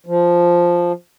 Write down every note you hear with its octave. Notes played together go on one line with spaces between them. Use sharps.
F3